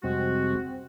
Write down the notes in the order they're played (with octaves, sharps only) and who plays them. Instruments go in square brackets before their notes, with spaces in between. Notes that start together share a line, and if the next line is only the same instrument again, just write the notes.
[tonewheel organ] F2 C3 G3 [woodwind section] G#3 F#4 [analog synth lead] C4